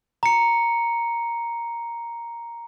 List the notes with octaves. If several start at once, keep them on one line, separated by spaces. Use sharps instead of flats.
A#5 C#7